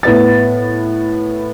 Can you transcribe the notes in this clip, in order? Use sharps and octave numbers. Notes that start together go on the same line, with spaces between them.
A2 B3 A6